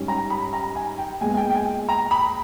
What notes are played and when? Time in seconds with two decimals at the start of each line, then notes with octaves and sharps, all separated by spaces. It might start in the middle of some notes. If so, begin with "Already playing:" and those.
Already playing: G#2 G3 C#4
0.08 A#5
0.30 B5
0.53 A#5
0.76 G#5
0.98 G5
1.21 A#2 G#3 B3 G#5
1.34 G#5
1.37 G5
1.49 G5
1.55 G#5
1.89 A#5
2.11 B5